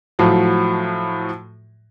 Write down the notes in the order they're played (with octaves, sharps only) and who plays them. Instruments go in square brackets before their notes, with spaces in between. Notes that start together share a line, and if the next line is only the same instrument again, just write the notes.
[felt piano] A2 F3 F#3